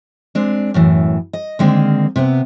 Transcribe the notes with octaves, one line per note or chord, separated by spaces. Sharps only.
G#3 C4 D4
F#2 A2 E3
D#5
D3 D#3 G#3 A#3 C4
C3 B3